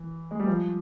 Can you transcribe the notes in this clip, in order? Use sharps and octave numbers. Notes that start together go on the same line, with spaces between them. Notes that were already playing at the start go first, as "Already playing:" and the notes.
Already playing: E3
G#3
G3
F3